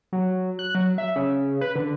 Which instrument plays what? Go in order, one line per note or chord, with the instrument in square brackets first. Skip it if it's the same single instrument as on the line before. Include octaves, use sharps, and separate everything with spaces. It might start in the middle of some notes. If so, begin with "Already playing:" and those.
[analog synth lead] F#3
F#6
F#3
E5
C#3
B4
D3